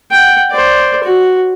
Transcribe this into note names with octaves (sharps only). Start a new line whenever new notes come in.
F#5 G5
C5 D5
F#4